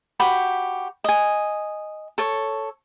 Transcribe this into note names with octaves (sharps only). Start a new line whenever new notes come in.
F#4 G4 B5
D#5 G#5
A4 C#5